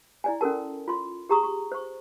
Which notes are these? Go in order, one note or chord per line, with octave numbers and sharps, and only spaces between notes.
E4 D5 G#5
C#4 F#4 A4 A#4 A5
F4 C6
G4 G#4 A#5 C#6 D#6
C#6
C5 C#6